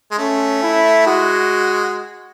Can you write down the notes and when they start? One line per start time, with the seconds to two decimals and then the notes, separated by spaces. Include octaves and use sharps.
0.11 G#3
0.18 A3 C#4
0.63 E4
1.07 G#3 F#4